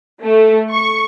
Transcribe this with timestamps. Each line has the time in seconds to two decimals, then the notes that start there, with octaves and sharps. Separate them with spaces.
0.22 A3
0.70 C#6